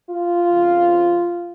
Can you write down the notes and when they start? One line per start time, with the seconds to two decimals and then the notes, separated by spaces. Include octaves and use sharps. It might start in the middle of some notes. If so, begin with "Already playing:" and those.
0.08 F4
0.49 F2 C#3 F3